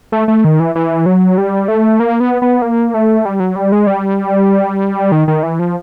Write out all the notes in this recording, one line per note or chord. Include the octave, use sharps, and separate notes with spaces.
A3
A3
D#3
E3
E3
F#3
G3
A3
A#3
B3
B3
A#3
A3
G3
F#3
G3
G#3
G3
D#3
D#3
E3
F3